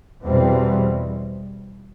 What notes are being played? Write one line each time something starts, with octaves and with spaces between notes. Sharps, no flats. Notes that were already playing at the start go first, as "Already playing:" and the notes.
E2 B2 G3 C4